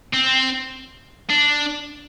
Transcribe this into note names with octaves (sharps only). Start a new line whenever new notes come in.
C4
D4